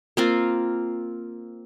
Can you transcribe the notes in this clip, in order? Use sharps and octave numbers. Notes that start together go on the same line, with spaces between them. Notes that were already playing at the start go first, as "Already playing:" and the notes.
A#3 C4 F4